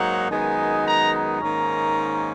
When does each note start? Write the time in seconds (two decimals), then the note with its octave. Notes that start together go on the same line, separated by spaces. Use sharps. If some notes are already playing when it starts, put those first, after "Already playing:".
Already playing: G#2 F#3 A#3 D#4 F#5
0.29 F#2 D#3 G#3 B3 D#4 G#5
0.85 A#5
1.13 A#5
1.41 G#2 D#3 A#3 C#4